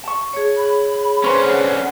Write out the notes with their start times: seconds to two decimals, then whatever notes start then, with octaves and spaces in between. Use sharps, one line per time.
0.04 A5 C#6
0.33 G#4 C#5
0.57 B5
1.24 D3 C#4 B4 C5 C#6
1.44 F#5